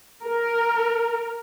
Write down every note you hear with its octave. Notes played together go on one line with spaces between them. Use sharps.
A#4